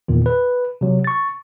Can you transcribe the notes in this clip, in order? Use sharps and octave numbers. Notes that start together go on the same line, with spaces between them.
E2 A#2 D#3
B4
C3 F#3
C#6 A6